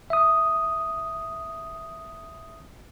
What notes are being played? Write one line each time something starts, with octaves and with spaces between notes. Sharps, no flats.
E5 D#6